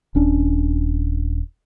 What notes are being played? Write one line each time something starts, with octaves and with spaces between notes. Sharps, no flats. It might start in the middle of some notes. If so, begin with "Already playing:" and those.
D#1 C#4 D4